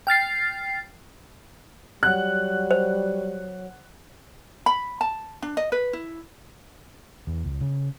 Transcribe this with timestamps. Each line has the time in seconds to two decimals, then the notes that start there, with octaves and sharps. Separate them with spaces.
0.07 G5 F6 A6 C7
2.03 F#3 G3 F#5 F#6
2.71 C5
4.66 B5
5.01 A5
5.42 D4
5.57 D#5
5.72 B4
5.93 E4
7.27 E2
7.45 C#2
7.61 C#3